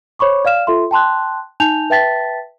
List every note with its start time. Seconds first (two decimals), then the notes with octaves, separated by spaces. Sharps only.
0.19 C5 C#5 B5 C#6 D6
0.45 D5 F5 F6 E7
0.67 F4 A4 E5 C6
0.91 G5 A5 C6 F#6
1.60 D#4 G#5 A5 G6 F7
1.90 B4 E5 G5 A5 A6 B6